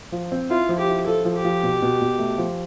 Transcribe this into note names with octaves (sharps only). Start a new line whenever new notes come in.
F3
C4
E4 F4
F3
G4
E4
F3 A4
F3
G4
F3
B2
B2
B2
A3
F3